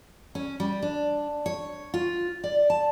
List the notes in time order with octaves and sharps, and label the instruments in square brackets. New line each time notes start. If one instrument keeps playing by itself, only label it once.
[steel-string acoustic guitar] C#4
G3
D4
C#5
F4
D5
A5